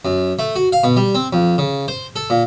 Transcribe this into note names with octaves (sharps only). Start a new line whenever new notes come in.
F#2
A3
F#4
F5
B2
G3
C4
F2
C#3
C5
A4
A#2